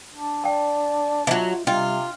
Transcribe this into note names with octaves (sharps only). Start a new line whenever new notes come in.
D4
D5 G5 A5
E3 F#3 F4 D#5 E5
C3 G3 D4 F4 D#5 G5